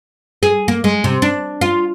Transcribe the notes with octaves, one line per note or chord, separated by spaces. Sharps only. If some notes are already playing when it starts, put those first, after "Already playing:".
G#4
A#3
G#3
C3
D4
F4